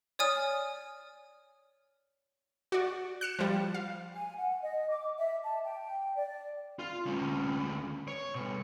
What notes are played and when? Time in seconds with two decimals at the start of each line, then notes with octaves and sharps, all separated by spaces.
0.19 C#5 D5 G#5 D#6 F6
2.72 F#4 D5
3.21 F#6 C#7 E7
3.39 F3 G3
3.74 F5
4.15 G#5
4.38 F#5
4.62 D#5
4.90 D6
5.18 E5
5.43 A5
5.65 G5
6.16 D5
6.79 F4
7.06 D2 C#4
8.08 C#5
8.35 B2 G3